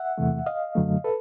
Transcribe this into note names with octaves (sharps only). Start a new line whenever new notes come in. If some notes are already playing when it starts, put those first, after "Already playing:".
Already playing: E5 F#5
E2 C3 E3 A3
D#5 F5
F#2 D3 F#3 A3
A4 B4